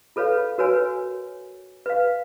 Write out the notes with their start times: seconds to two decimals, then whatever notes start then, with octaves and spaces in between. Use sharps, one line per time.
0.16 F4 A4 B4 C#5 F5
0.58 F#4 A#4 B4 C#5 G#5
1.86 B4 F5